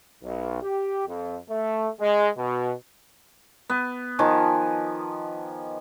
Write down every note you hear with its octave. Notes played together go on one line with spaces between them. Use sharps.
B1
G4
F2
A3
G#3
B2
B3
D#3 F3 G#5 D6